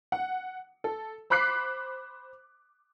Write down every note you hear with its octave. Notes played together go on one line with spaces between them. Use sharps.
F#5
A4
C5 B5 D6 F#6 B6 C7